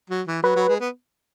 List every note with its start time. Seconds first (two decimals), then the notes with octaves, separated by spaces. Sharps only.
0.10 F#3
0.27 E3
0.43 F#3 B4
0.56 F#3
0.68 G#3
0.80 B3